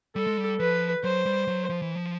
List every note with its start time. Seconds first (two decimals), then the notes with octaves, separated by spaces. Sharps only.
0.16 G3 A4
0.27 G#3
0.37 G3
0.60 F3 B4
1.04 F#3 C5
1.26 G3
1.48 F#3
1.70 F3
1.82 E3
1.95 F3